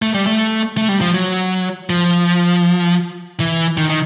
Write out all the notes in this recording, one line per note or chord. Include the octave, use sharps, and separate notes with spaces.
A3
G3
A3
A3
G3
F3
F#3
F3
E3
D#3
D#3